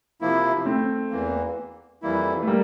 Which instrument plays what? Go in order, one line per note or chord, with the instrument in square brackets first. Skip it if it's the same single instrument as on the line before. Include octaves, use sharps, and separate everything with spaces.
[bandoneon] C3 F3 A#3 E4
[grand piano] A3 C4
[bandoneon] E2 E3 A#3
F2 E3 G3 A#3 E4
[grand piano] A3
G3 A#3